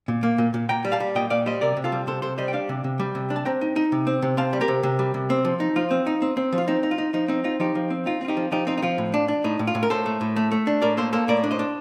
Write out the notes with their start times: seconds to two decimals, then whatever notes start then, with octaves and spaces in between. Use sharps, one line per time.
0.08 A#2
0.23 A#3
0.38 A#2
0.54 A#2
0.69 A#2 G5 A#5
0.85 G3
0.92 F5 A5
1.00 G3
1.15 A#2 D#5 G5
1.30 A#2 D5 F5
1.46 G3 C5 D#5
1.61 C3 A#4 D5
1.77 C3
1.84 F4 A4
1.92 G3
2.07 C3 A4 C5
2.22 C3 A4 C5
2.38 G3 C5 D#5
2.48 G5
2.53 D4 D5 F5
2.69 C3
2.84 C3
3.00 G3
3.15 C3
3.30 D4
3.36 A5
3.45 C4 G5 A#5
3.61 D#4
3.76 D#4
3.92 C3
4.07 C4
4.22 C3
4.37 C4 F5 A5
4.53 G3
4.61 G4 A#4
4.68 C3
4.83 C3
4.99 G3
5.14 C3
5.30 C4
5.45 F3
5.60 D#4
5.76 F3 F4
5.91 C4
6.07 D#4
6.22 C4
6.37 C4
6.52 F3
6.58 F4
6.68 C4 D#4
6.83 D#4
6.91 F4
6.98 D#4
7.13 F3 D#4
7.28 C4 D#4
7.44 D#4 F4
7.60 F3 D#4 G4
7.75 F3
7.90 C4
8.06 D#4 F4
8.21 C4 F4
8.28 D#4 G4
8.37 F3
8.52 F3 D#4 G4
8.67 C4 D#4
8.78 D#4
8.83 F3 F4
8.98 A2
9.14 D4
9.28 D4
9.44 A2 D#4
9.59 A2
9.67 F4
9.75 A2
9.83 A#4
9.90 A2 A4 C5
10.06 A3
10.21 A2
10.36 A3
10.51 A3
10.67 D4
10.82 A2 A#4 D5
10.97 A#3 A4 C5
11.13 A#3 A4 C5
11.28 A2 A#4 D5
11.44 D4
11.51 C5 D#5
11.59 D4